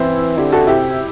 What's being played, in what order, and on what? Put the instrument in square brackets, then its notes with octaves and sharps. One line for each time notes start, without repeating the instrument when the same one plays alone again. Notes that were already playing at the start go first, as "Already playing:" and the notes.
Already playing: [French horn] E3 [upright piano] C4 E4
[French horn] D3 [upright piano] E4 G4
[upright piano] F#4 A4
[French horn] C3 [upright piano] E4 G4